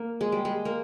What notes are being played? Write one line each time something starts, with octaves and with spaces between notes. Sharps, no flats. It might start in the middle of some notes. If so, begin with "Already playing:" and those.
Already playing: A#3
G#3
G3
G#3
A#3